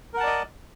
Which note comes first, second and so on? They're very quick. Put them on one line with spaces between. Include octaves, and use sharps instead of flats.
A#4 F#5 A5 D5 D#5